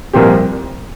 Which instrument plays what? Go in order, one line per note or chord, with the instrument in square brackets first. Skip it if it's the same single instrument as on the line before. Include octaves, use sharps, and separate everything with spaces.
[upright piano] C2 A#2 F3 C4 G4